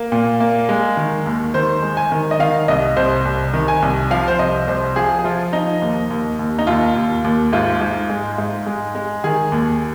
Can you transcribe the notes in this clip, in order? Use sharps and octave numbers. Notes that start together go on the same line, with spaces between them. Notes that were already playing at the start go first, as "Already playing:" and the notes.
Already playing: A#3
A#2
A#3
G#3
D#3
D#2
D#3 C5
G#3
G#5
D#3
D#5
D#3 F5
C2 D#5
C2 C5
C2
D#3
G#5
C2
F3 F5
C5
C2 D#5
C2 C5
F3 G#4
G#4
F3 F4
F3 D#4
D#2
D#2
D#2
D#4
D#2 F4
D#2
D#2
G#2 F4
G#2
G#3
G#2
G#3
G#3
D#3 G#4
D#2